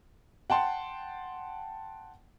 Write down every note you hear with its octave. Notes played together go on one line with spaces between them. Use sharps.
F#5 G5 A5 C6